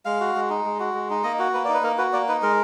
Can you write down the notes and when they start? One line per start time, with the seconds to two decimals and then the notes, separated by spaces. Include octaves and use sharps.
0.05 G#3 F5
0.21 F#4
0.35 G#3
0.50 D#4
0.65 G#3
0.80 F#4
0.94 G#3
1.10 D#4
1.24 A#3 D#5
1.39 F#4
1.54 A#3 B4
1.65 D#4 D5
1.74 B4
1.83 A#3 A#4
1.98 F#4 B4
2.13 A#3 D5
2.28 D#4 B4
2.42 G#3 A#4